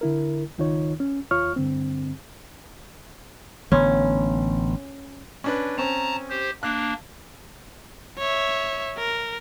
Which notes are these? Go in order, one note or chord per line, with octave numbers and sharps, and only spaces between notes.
D3 E4 A#4
C#2 D#3 D#4 F4 C#5
C#4
D#2 F4 C#5 C#6 F6
G2 D3 C4
A1 D3 B3 C#4
C#4 D4 B4
C4 C#4 A5 A#5
G4 C5
A#3 D4 F#6
C#5 E5
A#4